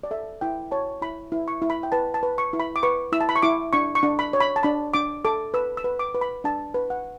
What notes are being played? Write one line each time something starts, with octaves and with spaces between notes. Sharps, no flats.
D5
A4 E5
E4 G5
C#5 A5
E4 B5
E4
C#6
E4
B5
G5
B4 A5
A5
B4
C#6
E4
B5
D6
B4 C#6
E4 E6
A5
B5
C#6
E4 D6
D4 C#6
C#6
D4
B5
C#5
B5
A5
D4 B5
D4 D6
A4 D6
B4 E6
E6
B4
D6
B4
B5
D4 A5
B4
F#5